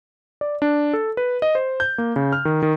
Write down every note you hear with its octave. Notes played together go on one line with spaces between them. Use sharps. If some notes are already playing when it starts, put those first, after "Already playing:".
D5
D4
A4
B4
D#5
C5
G6
A#3
C#3
F6
D#3
D#3